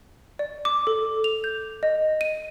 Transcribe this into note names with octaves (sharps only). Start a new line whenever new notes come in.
D5
D6
A4
F7
G6
D#5
D#7